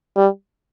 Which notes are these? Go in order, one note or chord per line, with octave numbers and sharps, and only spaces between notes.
G3